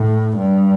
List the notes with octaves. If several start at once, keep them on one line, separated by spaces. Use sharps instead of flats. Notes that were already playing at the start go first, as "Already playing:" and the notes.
Already playing: A2
G2